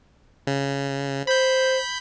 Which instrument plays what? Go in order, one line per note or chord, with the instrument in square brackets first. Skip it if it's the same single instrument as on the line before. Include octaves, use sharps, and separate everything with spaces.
[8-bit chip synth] C#3
[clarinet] C5 [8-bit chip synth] B5 G6